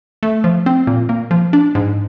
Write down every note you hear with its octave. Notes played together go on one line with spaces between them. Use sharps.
A3
F3
C4
A#2
A#3
F3
D4
G#2